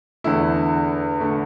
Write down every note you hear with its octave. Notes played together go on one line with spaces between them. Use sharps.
E2 D3 A3 E4
D3 A3